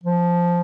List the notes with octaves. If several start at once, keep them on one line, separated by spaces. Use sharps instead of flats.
F3